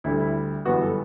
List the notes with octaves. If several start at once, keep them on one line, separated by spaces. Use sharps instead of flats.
D2 D3 G3 E4
E4
G1 F#2 E3 G3 B3 F#4
A4